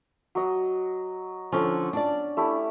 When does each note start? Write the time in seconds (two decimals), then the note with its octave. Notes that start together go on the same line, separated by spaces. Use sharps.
0.35 F#3 D#5
1.52 D3 F3 C#4
1.93 D4 D5
2.37 A3 E4 G4